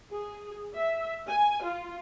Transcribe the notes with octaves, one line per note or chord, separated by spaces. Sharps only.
G#4
E5
G#5
F4